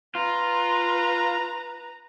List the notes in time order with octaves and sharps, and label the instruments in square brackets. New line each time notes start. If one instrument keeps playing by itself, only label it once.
[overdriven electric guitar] F4 [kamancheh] B4 A#5